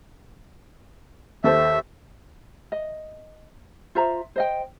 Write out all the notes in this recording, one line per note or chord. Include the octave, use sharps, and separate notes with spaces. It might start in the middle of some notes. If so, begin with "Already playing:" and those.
D#2 A4 C5 E5
D#5
F4 C5 E5 A#5
C5 D#5 G5